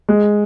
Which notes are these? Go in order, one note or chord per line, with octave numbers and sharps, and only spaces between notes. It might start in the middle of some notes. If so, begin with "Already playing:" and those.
G#3